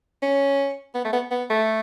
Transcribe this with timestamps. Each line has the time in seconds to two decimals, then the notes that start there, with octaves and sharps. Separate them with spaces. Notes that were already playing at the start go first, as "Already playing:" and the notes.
0.23 C#4
0.95 B3
1.05 A3
1.13 B3
1.31 B3
1.50 A3